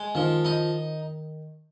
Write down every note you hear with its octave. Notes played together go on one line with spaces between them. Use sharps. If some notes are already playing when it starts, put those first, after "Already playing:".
Already playing: G#3
D#3 F3
D#4